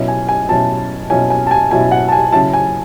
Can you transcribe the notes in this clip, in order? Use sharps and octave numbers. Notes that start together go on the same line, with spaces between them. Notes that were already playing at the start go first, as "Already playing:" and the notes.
Already playing: B2 F#3 C#4 E4
G#5
G#5
B2 F#3 C#4 E4 A5
B2 F#3 C#4 E4 G#5
G#5
A5
G#5
B2 F#3 C#4 E4 G#5
F#5
A5
G#5
C#3 F#3 C#4 E4 A5
G#5